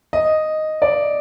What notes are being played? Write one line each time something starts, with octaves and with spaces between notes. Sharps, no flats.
D#5
D5